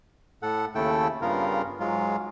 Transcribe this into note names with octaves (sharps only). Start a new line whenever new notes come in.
A2 A4 F#5
D#2 C#3 A3 E4 A4 G5
G2 C#3 B3 F4 A#4
G#2 F#3 G#3 F4